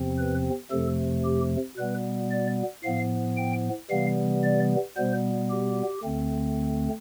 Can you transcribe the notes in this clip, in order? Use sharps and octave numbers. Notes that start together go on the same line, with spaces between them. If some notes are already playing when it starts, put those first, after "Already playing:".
Already playing: E2 C3 F3 C4
B4
F2 C3 F3 A3 A4
G4
B2 G3 B3 B4
D5
A2 F3 B3 F5
G5
C3 E3 G3 B3 F5
D5
B2 G3 B3 C5
G4
D2 D3 A3 C4